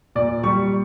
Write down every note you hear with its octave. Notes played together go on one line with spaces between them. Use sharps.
A#2 D5
G3 C#6